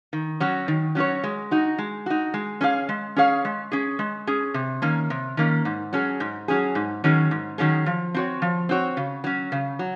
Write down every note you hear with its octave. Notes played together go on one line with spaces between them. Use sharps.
D#3
F#3 C#4 F#4 C#5
D#3
F#3 C#4 F#4 C#5
G#3
D#4 F#4
G#3
D#4 F#4
G#3
C#4 G#4 C#5 F5
G#3
C#4 G#4 C#5 F5
G#3
C#4 G#4
G#3
C#4 G#4
C3
D#3 A#3 C#4
C3
D#3 A#3 C#4
G#2
F#3 C#4 G#4
G#2
F#3 C#4 G#4
G#2
D#3 F#3 C#4 G#4
G#2
D#3 F#3 C#4 G#4
F3
C4 F#4 C#5
F3
C4 F#4 C#5
C#3
F#3 C#4
C#3
F#3